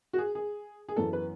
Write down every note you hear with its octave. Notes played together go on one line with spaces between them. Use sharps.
F#4
G#4
G#4
G#4
F#2 E3 B3 A4
B4